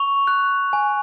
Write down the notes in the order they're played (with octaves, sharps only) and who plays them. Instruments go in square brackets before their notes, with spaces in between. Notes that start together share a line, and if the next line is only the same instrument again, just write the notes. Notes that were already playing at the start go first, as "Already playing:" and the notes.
Already playing: [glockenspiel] C#6 F7
F#6
G#5